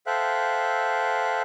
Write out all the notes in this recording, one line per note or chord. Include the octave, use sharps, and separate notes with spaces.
A4 C5 E5 F5 G5 F#6